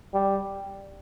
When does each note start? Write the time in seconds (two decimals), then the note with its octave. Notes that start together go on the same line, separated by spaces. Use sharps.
0.14 G3